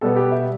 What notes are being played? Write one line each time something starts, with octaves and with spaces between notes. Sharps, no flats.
B2 G3 B3 A4
G4
E5